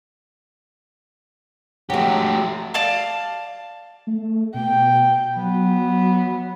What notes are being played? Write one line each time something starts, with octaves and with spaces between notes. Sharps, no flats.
F#3 G#3 A3 G4
D5 F5 A5
A3
B2 G5
F#3 B3